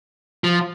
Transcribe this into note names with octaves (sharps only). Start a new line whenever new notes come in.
F3